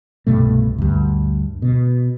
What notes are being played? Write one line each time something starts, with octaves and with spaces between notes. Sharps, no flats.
C2 G2 B2 A3
D2 G2
B2